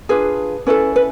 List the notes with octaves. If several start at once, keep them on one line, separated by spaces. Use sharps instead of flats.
D4 F4 G#4 B4
C#4 E4 A4 B4
B4